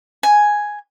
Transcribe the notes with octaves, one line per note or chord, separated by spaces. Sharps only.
G#5